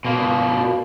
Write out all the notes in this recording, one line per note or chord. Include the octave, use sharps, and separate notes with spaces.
B2 A#3